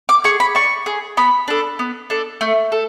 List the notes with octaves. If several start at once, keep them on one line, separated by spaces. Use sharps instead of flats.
D6
G#4 C#6
B5
D4 C#6
G#4
B3 B5
D4 A4
B3
D4 A4
A3
A4